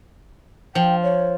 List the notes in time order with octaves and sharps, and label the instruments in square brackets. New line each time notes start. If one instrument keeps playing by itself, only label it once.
[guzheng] F3 [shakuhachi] G5
[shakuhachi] C#5